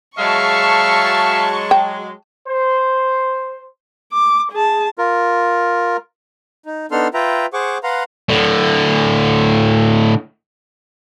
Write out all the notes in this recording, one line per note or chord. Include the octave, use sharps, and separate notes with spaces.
F#3 G#3 E5 F5 A5 C#6
G5
C5
D6
G#4 A5
F4 A#4
D#4
B3 D4 D#4 A4 C6 F6
F4 B4 E5 G5 A#5
G#4 C5 F#5 C#6 D6
B4 F5 F#5 A#5 C6
A2 D3